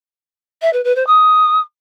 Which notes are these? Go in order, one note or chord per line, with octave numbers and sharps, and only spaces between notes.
E5
B4
B4
C5
D#6